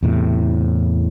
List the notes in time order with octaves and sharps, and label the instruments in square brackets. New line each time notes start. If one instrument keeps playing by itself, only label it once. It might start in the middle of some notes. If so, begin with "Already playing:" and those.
[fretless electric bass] E2 A2 C3